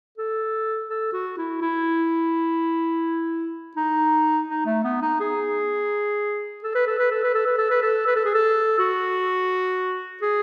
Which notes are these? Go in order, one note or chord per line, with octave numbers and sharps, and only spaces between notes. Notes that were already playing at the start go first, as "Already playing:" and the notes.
A4
A4
F#4
E4
E4
D#4
D#4
A3
B3
D#4
G#4
A4
B4
A4
B4
A4
B4
A4
B4
A4
B4
A4
B4
A4
G#4
A4
F#4
G#4